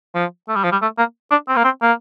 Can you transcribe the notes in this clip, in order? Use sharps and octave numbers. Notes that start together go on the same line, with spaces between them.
F3
A3
G3
F3
G3
A3
A#3
D4
C4
A#3
C4
A#3